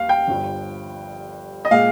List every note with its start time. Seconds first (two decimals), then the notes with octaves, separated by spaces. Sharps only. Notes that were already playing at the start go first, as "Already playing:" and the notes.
Already playing: D#2 F5
0.09 G5
0.28 G1 G2 F3
1.65 D#5
1.71 A#2 G#3 F5